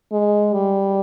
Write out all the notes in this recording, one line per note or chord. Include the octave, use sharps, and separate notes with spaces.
G#3
G3